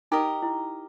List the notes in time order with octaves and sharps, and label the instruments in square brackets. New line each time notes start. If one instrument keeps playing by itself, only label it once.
[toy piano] D#4 [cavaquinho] G4 A#4 D#5
[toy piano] E4